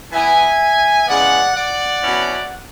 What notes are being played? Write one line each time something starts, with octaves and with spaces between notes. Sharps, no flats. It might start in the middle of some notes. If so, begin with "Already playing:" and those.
E3 B3 E4 E5 G#5
C#3 E3 G#3 B3 D5 F#5
D5 F#5
B2 F#3 C#4 E4